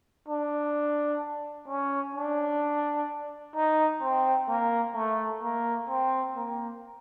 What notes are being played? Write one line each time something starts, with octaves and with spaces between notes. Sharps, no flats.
D4
C#4
D4
D#4
C4
A#3
A3
A#3
C4
A#3